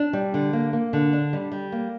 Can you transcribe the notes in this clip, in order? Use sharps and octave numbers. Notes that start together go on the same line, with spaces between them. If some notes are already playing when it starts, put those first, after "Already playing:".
Already playing: D4
G3
D3
A#3
A#3
D3
D4
G3
G3
A#3